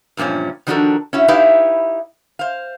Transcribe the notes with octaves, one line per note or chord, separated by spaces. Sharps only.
E2 G2 A#2 F3 C#4
D#3 F3 D4 F#4 A4 A#4
C#4 E4 F#4
D#4 E4 G4 B4 E5 F5
C5 F5